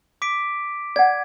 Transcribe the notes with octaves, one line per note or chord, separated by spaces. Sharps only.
D6 B6 D7
D5 F#5 G#6